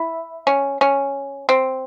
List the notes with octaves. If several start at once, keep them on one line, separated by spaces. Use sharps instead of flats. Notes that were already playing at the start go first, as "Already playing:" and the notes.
Already playing: E4
C#4
C#4
C4